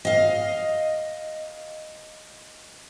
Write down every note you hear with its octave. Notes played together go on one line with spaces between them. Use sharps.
D#5 F5